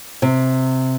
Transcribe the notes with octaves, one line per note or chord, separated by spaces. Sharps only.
C3